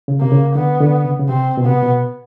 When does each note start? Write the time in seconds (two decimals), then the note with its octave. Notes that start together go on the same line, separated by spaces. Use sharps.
0.08 C#3
0.20 C3 A#3
0.32 C#3
0.55 D3 B3
0.80 D3
1.05 C#3
1.20 C#3
1.29 C3 C4
1.57 B2
1.65 C3 B3
1.83 B2